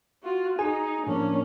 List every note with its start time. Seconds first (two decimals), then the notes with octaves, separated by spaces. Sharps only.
0.23 F4 F#4
0.59 D#4 G#4 G#5
1.07 A2 F3 A#3 C#4 D4